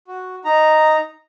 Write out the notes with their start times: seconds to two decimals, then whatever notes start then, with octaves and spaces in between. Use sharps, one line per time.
0.07 F#4
0.45 D#4 A#5